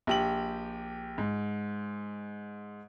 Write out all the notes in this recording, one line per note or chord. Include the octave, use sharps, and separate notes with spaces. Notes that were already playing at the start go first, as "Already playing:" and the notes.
A#1 G4 F#7
G#2